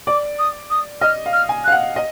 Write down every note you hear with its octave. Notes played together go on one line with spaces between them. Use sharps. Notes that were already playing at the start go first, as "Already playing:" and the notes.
D5 D6
D#6
D#6
D#5 F6
F5
F6
G#5
F5 F#6
F#5
D#5